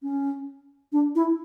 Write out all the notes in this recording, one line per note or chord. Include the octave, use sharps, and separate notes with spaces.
C#4
D4
E4